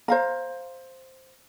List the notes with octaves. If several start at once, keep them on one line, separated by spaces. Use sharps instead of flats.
C5 F5 A#5